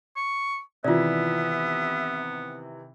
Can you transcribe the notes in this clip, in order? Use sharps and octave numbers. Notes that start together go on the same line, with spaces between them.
C#6
C3 D#3 E3 B3 F4 D5 E5